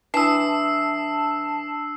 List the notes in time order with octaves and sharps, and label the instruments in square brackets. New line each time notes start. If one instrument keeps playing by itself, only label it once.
[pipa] E3 [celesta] D4 D#6 [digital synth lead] A5 [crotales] E6 C7